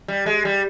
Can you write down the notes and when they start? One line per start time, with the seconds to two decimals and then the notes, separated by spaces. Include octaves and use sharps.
0.08 G3
0.26 G#3
0.45 G3